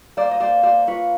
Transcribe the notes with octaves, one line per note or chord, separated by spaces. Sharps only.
A#3 C5 D5
D#5
A#3 C5 D5
A#3 C5 D5
F4 B4 C#5